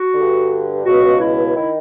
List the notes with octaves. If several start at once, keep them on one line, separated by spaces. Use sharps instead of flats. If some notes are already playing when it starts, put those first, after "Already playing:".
Already playing: F#4
G2 D3
C#2 B2 F#4
E4
D#3 E4